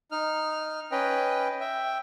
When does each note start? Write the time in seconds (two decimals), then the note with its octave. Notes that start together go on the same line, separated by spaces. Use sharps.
0.11 D#4 F6
0.91 C#4 B4 D#5 G5
1.61 E5 G5